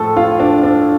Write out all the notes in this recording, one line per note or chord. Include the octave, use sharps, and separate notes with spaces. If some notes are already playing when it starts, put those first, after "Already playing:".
Already playing: A2 F3 A4
F4
D4
D4